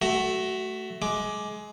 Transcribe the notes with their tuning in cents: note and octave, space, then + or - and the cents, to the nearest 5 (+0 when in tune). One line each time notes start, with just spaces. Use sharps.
A3 +0 F#4 +25
G#3 +20 D6 +5